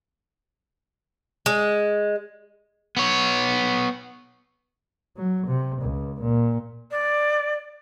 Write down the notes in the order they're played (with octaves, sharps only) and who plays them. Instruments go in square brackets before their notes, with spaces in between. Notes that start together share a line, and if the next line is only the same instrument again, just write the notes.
[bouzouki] G#3
[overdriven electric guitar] B3 C#5
[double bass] F#3
C3
C#2
A#2
[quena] D5